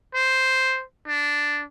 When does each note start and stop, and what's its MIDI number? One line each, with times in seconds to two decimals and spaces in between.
0.15 0.83 72
1.08 1.63 62